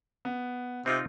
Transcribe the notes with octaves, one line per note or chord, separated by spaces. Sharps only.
B3
C3 C4 D#4 F4